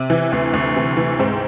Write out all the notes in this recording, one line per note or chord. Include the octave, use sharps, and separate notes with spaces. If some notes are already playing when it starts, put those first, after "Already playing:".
Already playing: C3
E3
D2
D2
C3
E3
G#2 C4